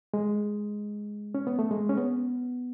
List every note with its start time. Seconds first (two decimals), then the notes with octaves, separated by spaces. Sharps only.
0.14 G#3
1.34 C#4
1.47 B3
1.59 A3
1.71 G#3
1.89 C#4
1.97 B3